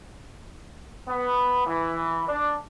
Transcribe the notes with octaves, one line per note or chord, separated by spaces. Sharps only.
B3
E3
D4